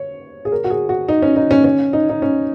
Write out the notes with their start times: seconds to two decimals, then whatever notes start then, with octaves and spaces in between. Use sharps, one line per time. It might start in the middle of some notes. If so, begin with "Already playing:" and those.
Already playing: C#5
0.45 G#4
0.52 A#4
0.64 F#4
0.70 G#4
0.89 F#4
1.09 D#4
1.22 C#4
1.36 D#4
1.51 C#4
1.64 C#4
1.93 D#4
2.09 D#4
2.22 C#4